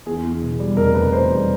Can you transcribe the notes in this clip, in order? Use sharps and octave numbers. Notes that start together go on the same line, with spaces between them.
E2 G#4
E2
B2
G3
F1 A#4
F1 B4
E2 C5
G3